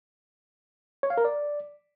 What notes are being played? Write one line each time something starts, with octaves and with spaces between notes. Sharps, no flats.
C#5
F5
A#4
D5